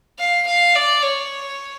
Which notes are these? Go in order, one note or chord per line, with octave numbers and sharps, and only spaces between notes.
F5
F5
D5
C#5